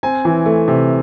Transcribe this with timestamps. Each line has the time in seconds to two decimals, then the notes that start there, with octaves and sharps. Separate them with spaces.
0.03 C4 G#5
0.25 E3
0.46 A3
0.68 C3